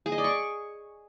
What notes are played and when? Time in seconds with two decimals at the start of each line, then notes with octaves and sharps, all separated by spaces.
0.06 G#4
0.12 D#5
0.18 D5
0.24 C#6